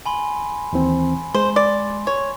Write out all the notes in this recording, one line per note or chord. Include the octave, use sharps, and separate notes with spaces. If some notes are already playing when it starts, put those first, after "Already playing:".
G#5 B5 C6
D#2 E3 C4
G#3 C5 C6
D5
C#5